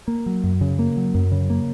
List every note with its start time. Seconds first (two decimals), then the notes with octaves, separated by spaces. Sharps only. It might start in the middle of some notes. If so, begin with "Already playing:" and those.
0.08 A#3
0.26 F#3
0.44 F#2
0.61 C#3
0.79 A#3
0.97 F#3
1.14 F#2
1.32 C#3
1.50 A#3